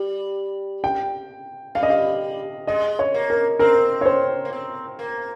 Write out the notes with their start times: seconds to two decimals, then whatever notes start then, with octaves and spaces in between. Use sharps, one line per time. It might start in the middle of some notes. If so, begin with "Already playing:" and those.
Already playing: G3
0.84 G5
1.75 G3 F5
1.83 D#5
1.90 F5
2.67 G#3 D#5
2.99 C#5
3.14 A#3
3.30 A#4
3.59 C4 A#4
4.01 C#5
4.06 C5
4.45 A#3
4.53 C4
4.99 A#3